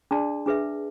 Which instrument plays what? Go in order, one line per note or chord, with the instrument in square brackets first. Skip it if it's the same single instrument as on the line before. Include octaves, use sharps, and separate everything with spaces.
[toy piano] D4 G#4 D5 A5 C6
D4 G#4 B4 E5